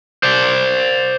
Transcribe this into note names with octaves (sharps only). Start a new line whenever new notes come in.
C5 D5